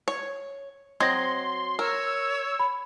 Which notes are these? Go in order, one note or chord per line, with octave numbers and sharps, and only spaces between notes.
C#5
F#3 C4 D#5 C6 G#6 A#6
A#4 C#5 E6
B5